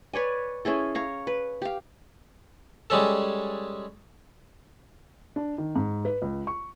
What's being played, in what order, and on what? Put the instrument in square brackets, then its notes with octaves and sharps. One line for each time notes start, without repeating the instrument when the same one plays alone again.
[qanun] B4 C#5 D5 G#5
C#4 E4 G#4 A4
C#5 F5 A#5
B4
G4 F5
[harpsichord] G3 G#3 C#4 A4
[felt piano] D4
D#3
G#2
B4
C#2
C#6